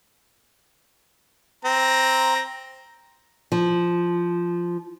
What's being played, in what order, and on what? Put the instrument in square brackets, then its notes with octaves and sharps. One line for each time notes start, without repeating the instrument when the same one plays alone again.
[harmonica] C4 A#5
[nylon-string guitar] F3